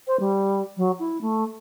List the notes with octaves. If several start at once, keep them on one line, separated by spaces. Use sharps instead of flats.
C5
G3
F#3
E4
A3